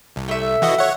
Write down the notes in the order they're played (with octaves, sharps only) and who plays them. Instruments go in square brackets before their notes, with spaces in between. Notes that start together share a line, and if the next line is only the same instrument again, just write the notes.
[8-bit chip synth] C2
[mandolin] A3 E5
[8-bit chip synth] E3 F#4 D#5
C#5 F#5